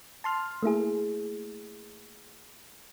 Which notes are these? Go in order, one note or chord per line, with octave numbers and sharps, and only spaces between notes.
A5 C6 F6
A3 A#3 E4 G#4